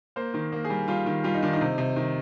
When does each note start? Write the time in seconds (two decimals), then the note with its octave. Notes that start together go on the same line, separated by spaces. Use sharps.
0.16 A#3 C5
0.34 D#3
0.52 A#3
0.64 G#4
0.70 G3
0.88 G3 F4
1.06 D#3
1.24 G3 F4
1.34 D#4
1.42 D#3 D4
1.53 D#4
1.61 C3
1.78 C3
1.96 D#3